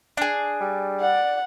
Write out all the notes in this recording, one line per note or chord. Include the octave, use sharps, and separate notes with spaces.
D4 G#4
G3
D5 F#5